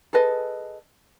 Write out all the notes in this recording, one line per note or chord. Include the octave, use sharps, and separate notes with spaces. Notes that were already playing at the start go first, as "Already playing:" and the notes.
G#4 A4 B4 D#5